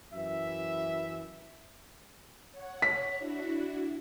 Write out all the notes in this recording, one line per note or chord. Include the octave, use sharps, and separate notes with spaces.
F#2 E3 E5
C#5 F#5
B6
D4 E4 F#4